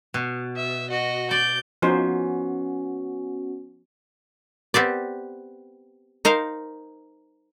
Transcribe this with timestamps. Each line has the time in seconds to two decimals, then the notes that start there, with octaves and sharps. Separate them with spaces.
0.14 B2
0.56 E5
0.90 F#4 D#5
1.31 D5 G6
1.82 F3 B3 C#4 D#4 F#4 C5
4.74 B3 C4 G4 D5
6.25 D#4 A#4 C5 F5